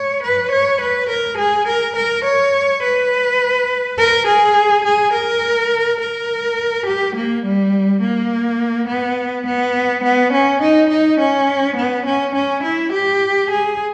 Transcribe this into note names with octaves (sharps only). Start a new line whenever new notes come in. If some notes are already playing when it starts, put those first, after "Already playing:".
Already playing: C#5
B4
C#5
B4
A#4
G#4
A#4
A#4
C#5
B4
A#4
G#4
G#4
A#4
A#4
G4
A#3
G3
A#3
B3
B3
B3
C#4
D#4
D#4
C#4
B3
C#4
C#4
E4
G4
G#4